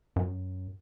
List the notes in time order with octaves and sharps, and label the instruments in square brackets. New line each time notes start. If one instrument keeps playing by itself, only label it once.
[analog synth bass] F#2